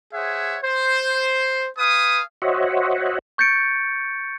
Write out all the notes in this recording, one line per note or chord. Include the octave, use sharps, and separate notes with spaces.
G#4 C5 C#5 E5 F#5
C5
B4 F5 G#5 D#6
F#4 C5 C#5 D#5 E5 F#5
C#6 G6 A6 C#7 D7